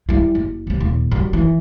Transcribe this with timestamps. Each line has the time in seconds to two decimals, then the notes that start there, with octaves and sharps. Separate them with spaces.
0.09 G3 E4
0.35 F#1
0.67 C3 G3
0.81 D#1
1.12 F#2 G3
1.33 E3